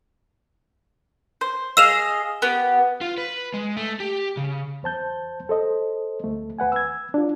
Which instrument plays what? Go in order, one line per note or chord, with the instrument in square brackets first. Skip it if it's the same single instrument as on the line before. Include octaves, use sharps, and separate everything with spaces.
[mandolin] C5
[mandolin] G#4 D#5 F5 [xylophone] E6 E7 F7
[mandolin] B3 G4
[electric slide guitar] F4
B4
G#3
A3
G4
C#3
[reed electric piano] E2 C5 A5 G6
A4 C5 D#5
D2 A3
D#2 B4 F#5 G#5
E6 G#6
D4 F4